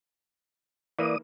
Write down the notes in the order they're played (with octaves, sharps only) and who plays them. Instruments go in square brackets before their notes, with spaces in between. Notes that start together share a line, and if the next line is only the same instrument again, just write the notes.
[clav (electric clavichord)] E3 A#3 [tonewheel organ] D5 D#6